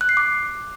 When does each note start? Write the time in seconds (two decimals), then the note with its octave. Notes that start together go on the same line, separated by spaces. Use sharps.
0.01 F#6
0.09 C7
0.17 D6